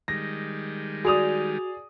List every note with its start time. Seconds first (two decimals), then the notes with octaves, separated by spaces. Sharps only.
0.08 D#3 G3 G#3 A#6
1.05 F#4 G#4 D5 D#6 F7